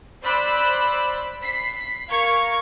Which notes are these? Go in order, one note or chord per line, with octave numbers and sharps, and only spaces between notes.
C5 D5 B5 E6 F#6
B5 B6 C7
A#4 F5 C#6 G#6